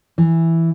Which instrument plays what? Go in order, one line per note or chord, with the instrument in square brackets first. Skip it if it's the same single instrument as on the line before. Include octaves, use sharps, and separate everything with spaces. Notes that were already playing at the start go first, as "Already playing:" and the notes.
[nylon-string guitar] E3